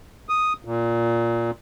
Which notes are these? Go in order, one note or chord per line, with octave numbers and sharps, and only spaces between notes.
D#6
A#2